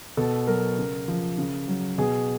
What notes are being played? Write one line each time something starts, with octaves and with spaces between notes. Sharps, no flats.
B2 A4
F#3 A#4
C#3
F3
C#3
F#3
B2 G#4